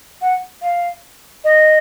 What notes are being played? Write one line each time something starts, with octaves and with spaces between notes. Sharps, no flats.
F#5
F5
D#5